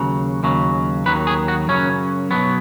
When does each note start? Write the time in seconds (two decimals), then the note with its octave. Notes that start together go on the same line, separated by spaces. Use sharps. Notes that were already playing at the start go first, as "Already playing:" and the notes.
Already playing: D#2 C#3 F#3
0.43 D#2 C#3 F#3
1.06 D#2 D#3 F#3 B4
1.27 G#4
1.48 F#4
1.68 F#2 C#3 F#3 C#4
2.31 B1 B2 F#3 B3